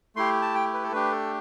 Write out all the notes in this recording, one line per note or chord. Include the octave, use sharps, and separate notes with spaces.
A3 E4 G4 C6
A5
G5
B4
A4
A3 D4 G4 B4
A4